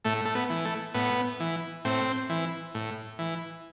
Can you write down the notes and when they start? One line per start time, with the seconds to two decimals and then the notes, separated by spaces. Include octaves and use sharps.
0.05 A2 A3
0.25 A3
0.35 B3
0.50 E3
0.65 A3
0.94 A2 B3
1.40 E3
1.85 A2 C4
2.30 E3
2.75 A2
3.19 E3